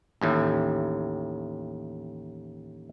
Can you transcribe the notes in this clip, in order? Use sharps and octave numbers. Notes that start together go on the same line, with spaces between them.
A1 D#2 A2